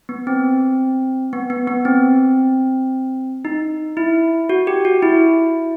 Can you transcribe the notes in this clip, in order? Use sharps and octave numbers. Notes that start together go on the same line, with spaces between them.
B3
C4
B3
B3
B3
C4
D#4
E4
F#4
G4
F#4
E4